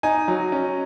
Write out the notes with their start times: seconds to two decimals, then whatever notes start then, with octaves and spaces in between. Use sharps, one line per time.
0.03 D#4 G#5
0.28 F#3
0.52 C#4